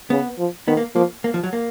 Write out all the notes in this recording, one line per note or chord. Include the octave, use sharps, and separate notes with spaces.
C#3 B3
F3
D#3 B3
A#3
F3 A#3
A#3
F3
F#3
A#3